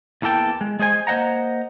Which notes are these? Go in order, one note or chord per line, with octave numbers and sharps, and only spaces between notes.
E2 E3 A#3 A4 G5
G#3
G#3 G#4 C5 G#5
A#3 C5 D#5 F#5 A#5